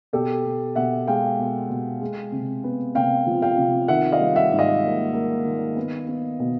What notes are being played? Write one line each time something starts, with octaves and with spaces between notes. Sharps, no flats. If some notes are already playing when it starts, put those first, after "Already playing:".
B2 G4 A4
B2
B2 E5 F#5
G#3 F5 G5
B2
B2
G#3
C3
B3
C3 F5 G5
F3
F5 G5
C3
D#3 E5 F#5
D#5 F5
G3
E5 F#5
G#2
D#5 F5
A#3
A#3
D#3
B3
B3
B2